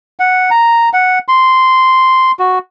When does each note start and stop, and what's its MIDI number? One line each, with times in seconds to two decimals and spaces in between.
0.20 0.50 78
0.51 0.89 82
0.93 1.19 78
1.28 2.32 84
2.39 2.59 66